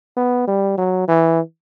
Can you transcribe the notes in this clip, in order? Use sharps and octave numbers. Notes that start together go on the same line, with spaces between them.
B3
G3
F#3
E3